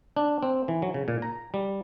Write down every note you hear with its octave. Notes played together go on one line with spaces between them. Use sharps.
D4
C4
E3
F#3
C#3
A#2
A#5
G3